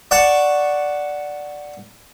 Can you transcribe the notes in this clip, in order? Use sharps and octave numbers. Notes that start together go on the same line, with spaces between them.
D5 F#5 A5 C#6